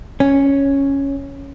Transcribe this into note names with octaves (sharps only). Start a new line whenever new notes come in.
C#4